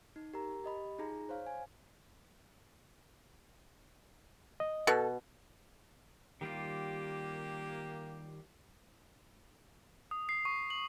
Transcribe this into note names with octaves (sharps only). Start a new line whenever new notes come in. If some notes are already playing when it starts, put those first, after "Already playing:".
D#4
G4 A#4 A#5
G4 D#5 B5
D#4 F4 G#4 A#5
C5 C#5 F5
G#5
D#5
B2 A4
D#3 G3 A#3 F4 G4
D#6
C7
C#6
F#7